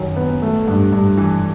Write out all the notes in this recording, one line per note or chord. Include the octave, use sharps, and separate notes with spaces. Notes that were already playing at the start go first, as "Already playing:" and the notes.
Already playing: F#2 D#3 F#3
B3
A3
G2
G2
E3